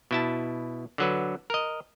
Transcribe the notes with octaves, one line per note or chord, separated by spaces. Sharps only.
B2 E4 A5
D3 F#3 B4
A#4 D#5